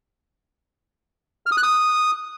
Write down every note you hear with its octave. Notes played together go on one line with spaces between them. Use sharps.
F6
D#6
F#6
D#6